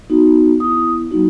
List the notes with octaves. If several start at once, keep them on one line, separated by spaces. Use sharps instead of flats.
B3 D#4 F#4
B3 E4 D#6
F#3 A#3 D#4 F#4